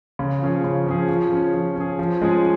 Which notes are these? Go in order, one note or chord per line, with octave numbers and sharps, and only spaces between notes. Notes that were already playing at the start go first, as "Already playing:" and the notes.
C#3
F3 C#4 G#4
C#3
F3 C#4 G#4
F3
C#4 G#4
F3
C#4 G#4
F3
G#3 C#4 F4 G#4